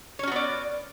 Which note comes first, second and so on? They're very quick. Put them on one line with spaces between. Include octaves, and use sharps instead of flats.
C#5 C#4 F#4 B3 D5